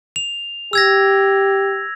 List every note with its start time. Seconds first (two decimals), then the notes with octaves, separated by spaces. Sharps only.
0.16 F7
0.73 G4 E6 G#6 A#6